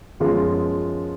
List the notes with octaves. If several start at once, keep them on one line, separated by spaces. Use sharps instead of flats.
F#2 F3 G#3 B3 F4